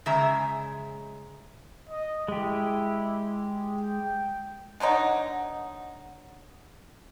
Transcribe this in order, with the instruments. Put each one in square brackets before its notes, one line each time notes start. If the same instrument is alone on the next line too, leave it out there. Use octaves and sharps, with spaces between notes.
[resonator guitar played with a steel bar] C#3 G#3 E5 A#5
[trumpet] D#5
[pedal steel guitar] G#3 G4 [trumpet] E4
[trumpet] G5
[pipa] B2 D3 F#3 D#4